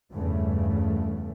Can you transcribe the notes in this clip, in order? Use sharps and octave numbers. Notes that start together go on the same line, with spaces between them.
E2 G2 C#3 A3